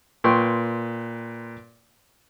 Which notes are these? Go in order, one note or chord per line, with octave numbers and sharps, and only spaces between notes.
A#2 B4 G5 C6 C#6